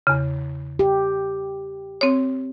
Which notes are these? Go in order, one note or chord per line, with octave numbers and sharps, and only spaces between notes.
E2 C#3
G4
C4 C#5